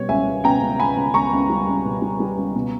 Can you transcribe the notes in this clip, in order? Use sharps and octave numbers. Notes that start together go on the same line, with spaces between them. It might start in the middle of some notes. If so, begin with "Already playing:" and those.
Already playing: B2 G3 C#5
C#2 E5 G#5
C#2
B2 G5 A#5
C#2
C#2 G#5 B5
C#2
C#2 A#5 C#6
C#2
G3
C#2
B2
G3
G3
C#2
B2